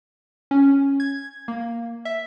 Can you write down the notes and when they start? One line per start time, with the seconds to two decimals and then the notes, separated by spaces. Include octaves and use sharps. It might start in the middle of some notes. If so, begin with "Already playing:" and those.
0.51 C#4
1.00 G#6
1.48 A#3
2.05 E5